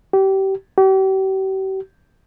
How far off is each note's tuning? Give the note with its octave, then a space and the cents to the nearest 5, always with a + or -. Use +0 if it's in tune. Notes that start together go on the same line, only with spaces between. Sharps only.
G4 -25
G4 -40